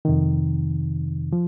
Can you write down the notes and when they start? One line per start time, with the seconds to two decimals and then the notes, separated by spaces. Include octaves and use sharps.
0.05 F2 C3 D#3
1.33 F3